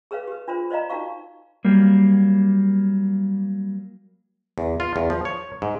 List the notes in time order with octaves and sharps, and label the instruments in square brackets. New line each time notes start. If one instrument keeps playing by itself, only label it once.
[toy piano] G#4 A#4 B4 C#5 F5
G4 B4
D4 F4 A#4 C5
C5 D5 D#5 F5 A#5
D4 D#4 F#4 A#4 F5 C#6
[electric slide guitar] F#3 G3 A#3
[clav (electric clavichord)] E2
F4
E2
F3
C#5
G#2